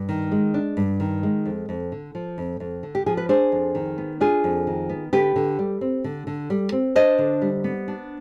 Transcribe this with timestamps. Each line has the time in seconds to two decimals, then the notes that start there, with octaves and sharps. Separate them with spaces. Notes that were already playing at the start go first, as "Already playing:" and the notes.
Already playing: G2
0.09 D#3
0.32 G#3
0.54 D4
0.77 G2
1.00 D#3
1.23 G#3
1.45 F2
1.69 F2
1.92 D3
2.15 F3
2.38 F2
2.60 F2
2.83 D3
2.95 G4
3.06 F3 G#4
3.17 B4
3.29 D4 G#4 C5
3.52 F2
3.75 D#3
3.98 B3
4.20 D4 F4 G#4
4.44 F2
4.67 D#3
4.89 B3
5.13 D3 G4 B4
5.36 D3
5.59 G3
5.81 C4
6.04 D3
6.27 D3
6.50 G3
6.72 C4
6.96 D4 C5 D#5
7.18 D3
7.42 G3
7.64 B3
7.88 D4